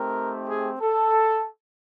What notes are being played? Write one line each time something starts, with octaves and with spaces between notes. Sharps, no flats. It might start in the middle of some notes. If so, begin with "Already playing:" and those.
Already playing: A3 C4 D#4 G4 A#4
G#4
A4